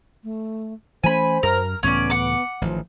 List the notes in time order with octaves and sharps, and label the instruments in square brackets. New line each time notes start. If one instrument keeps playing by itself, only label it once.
[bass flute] A3
[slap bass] E3 A3 C#4 [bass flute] C5 [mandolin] G#5 B5
[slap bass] F#2 [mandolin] A#4
[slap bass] C#2 A2 E3 [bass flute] B3 [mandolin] C#4 D5
[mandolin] F#5 D6
[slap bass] A1 D#3 [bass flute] F3